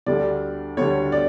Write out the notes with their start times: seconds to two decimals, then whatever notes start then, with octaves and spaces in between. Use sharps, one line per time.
0.06 D2 D3 G3 D5
0.77 D2 D3 G3 C#5
1.12 D5